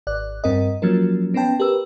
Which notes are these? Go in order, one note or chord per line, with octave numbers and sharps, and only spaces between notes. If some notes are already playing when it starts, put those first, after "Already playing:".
G#1 D5 F#6
G2 C4 A#4 D#5
F3 F#3 A#3 C#4 A#4
B3 C#4 B4 G5 A5
G4 A#4 B4 E6